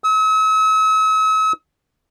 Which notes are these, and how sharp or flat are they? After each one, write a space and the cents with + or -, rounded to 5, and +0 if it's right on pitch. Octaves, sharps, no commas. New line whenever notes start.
E6 -45